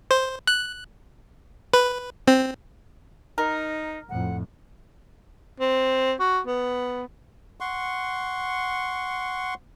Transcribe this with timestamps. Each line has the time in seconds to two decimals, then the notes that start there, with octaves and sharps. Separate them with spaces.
0.11 C5
0.47 F#6
1.73 B4
2.27 C4
3.38 D#4 A#4
4.09 F2 A2 F#5
5.60 C4
6.20 F#4
6.47 B3
7.60 F#5 C6 C#6